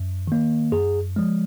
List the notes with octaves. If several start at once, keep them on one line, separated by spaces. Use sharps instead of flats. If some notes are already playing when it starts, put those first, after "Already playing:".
Already playing: F#2
D#3 A#3
F#2 G#4
F3 G#3